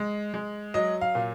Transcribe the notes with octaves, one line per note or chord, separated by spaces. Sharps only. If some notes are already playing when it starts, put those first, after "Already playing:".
Already playing: G#3
G#3
F#3 D#5
F5
A#2